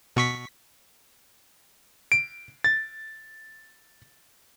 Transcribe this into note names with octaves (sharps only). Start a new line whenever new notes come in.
B2 C#6 B6
D7
A6